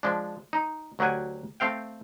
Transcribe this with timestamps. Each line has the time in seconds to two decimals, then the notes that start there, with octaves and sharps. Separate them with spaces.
0.03 F3 G#3 D4
0.53 D#4
0.99 D2 F#3 G4 F#5 G#5
1.60 A3 C4 F5 G5